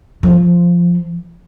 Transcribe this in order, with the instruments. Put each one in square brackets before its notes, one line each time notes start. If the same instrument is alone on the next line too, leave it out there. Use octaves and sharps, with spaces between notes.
[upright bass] F3